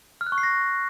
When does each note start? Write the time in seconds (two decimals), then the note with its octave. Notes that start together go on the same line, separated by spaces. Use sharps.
0.21 F6
0.27 F#6
0.32 C#6
0.38 C7
0.43 A#6